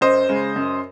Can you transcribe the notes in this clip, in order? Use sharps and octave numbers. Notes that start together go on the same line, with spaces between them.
F#2 C5 D#5
C#3 G#3
F#2